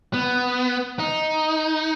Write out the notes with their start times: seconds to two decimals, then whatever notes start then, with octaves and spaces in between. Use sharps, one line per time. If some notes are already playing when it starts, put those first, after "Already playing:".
0.14 B3
0.99 D#4